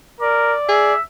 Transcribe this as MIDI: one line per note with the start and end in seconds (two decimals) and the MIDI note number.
0.21 0.55 70
0.21 0.94 74
0.69 0.94 68
0.69 1.02 76